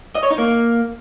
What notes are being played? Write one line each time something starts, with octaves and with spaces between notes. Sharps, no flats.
D#5
C#5
D#4
A#3